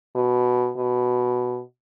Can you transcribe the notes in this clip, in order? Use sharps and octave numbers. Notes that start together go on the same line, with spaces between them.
B2
B2